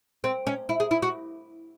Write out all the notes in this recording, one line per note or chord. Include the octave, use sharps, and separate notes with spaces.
C4
C#4
E4
G#4
E4
F#4